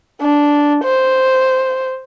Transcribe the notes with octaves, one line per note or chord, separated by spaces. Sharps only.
D4
C5